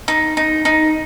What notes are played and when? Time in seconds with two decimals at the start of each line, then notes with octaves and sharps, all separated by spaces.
0.08 D#4
0.37 D#4
0.65 D#4